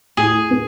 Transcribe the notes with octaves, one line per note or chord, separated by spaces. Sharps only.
A2 G#4
B3